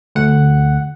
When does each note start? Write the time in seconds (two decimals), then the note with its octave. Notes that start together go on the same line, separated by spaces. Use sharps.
0.15 D2 F#5